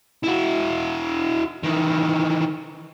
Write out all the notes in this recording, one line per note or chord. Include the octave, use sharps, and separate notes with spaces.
E4 F#4
D#3 E3